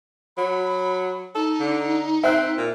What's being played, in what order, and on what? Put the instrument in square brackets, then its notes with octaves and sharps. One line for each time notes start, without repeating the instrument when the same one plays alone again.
[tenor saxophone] F#3 [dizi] B5
[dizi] D#4 [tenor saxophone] A4
[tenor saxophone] D3
[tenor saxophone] C4 [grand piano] E5 F#6
[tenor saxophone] A#2